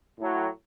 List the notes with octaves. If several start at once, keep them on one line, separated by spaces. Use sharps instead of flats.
A2 F#3